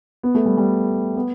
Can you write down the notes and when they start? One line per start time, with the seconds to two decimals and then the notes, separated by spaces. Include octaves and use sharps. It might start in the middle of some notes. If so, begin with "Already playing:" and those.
0.23 B3
0.35 A3
0.45 G3
0.57 G3
1.16 B3